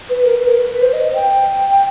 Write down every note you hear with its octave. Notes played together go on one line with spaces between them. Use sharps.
B4
A#4
B4
A#4
B4
B4
C5
D#5
D#5
G5